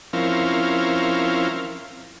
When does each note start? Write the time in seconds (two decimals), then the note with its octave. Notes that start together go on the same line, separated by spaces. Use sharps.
0.13 F3 C4 C#4 E4 A#4 F5